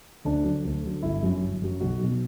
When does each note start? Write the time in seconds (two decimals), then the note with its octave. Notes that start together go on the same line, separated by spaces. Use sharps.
0.25 D2 D4
0.45 D3 F#3
0.65 D2
0.84 D3 F#3
1.02 G1 E4
1.23 F#2 F#3
1.42 G1
1.62 F#2 F#3
1.80 B1 F#4
2.00 B2 F#3